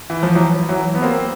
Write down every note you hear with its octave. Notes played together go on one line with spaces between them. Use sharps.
E3
F3
E3 F#3
E3 F#3
B3
A#3 C4